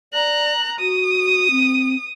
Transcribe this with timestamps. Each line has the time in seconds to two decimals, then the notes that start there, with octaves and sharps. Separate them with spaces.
0.13 D5 A#5 F#6
0.79 F#4 D#6
1.51 C4